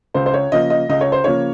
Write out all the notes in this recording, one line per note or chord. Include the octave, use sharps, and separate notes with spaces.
C#2 C5
C5
C#5
C#3 F3 A#3 D#5
D#5
C#2 D#5
C#5
C5
C#3 F3 A#3 C#5